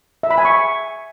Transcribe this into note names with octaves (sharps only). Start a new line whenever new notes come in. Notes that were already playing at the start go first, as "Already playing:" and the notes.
E5
B5
G#5
C#6